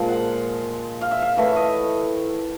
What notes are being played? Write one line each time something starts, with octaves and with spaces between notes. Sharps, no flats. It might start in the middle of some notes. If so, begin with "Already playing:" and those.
Already playing: A#2 F3 G#3
F#5
F5
E5
F5
A2 E3 A3 E5
D#5